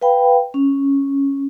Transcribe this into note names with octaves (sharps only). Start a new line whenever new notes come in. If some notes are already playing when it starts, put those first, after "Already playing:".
B4 F5 G5 B5
C#4